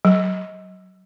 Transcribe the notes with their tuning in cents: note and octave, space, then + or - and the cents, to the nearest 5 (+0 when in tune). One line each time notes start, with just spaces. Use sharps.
F#3 +20